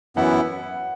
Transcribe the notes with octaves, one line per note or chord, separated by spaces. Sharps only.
F#2 E3 B3 E4 F#5